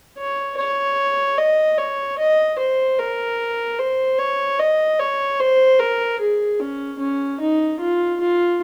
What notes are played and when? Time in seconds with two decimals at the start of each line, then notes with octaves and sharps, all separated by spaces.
0.18 C#5
0.57 C#5
1.38 D#5
1.78 C#5
2.19 D#5
2.59 C5
2.98 A#4
3.79 C5
4.19 C#5
4.59 D#5
4.99 C#5
5.39 C5
5.80 A#4
6.20 G#4
6.60 C#4
7.00 C#4
7.41 D#4
7.80 F4
8.20 F4